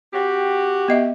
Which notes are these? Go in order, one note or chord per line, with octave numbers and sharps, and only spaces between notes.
C4 F#4 G4
B3 D#5 E5